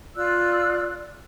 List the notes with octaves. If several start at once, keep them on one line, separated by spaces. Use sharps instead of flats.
F4 D5 E6 F#6